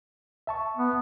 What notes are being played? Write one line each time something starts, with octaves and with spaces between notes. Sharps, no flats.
E5 A5 C#6
B3